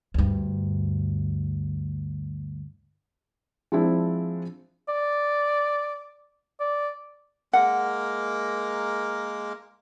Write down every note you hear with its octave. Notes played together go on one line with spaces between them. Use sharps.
D2 G2
F3 G#3 C4 D4 E4
D5
D5
G#3 A#3 A#4 F#5